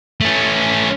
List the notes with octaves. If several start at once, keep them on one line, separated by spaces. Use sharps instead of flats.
A3 C#4